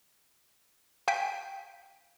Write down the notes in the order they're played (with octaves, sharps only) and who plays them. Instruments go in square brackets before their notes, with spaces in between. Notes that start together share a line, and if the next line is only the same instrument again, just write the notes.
[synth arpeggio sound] F5 G5 G#5 G6 B6 D7